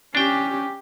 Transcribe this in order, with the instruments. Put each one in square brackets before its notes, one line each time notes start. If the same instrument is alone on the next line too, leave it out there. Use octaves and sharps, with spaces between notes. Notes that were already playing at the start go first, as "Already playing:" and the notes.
[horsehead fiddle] C#4 G4 [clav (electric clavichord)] D4 G5